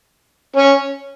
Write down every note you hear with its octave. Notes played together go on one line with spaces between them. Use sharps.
C#4 C#5